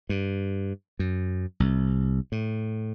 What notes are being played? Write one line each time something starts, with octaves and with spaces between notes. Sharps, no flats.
G2
F#2
C2
A2